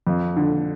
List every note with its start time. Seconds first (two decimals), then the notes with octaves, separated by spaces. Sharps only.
0.07 F2
0.36 D3